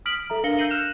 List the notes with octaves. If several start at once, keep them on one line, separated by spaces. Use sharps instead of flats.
D#6 F6 B6 D7 F#7
A4 E5 A#5
D4 A#4 F5 A#6 C#7 G7
E6 G6 A#6 C7 D#7 F#7
F6 F#6 E7 F7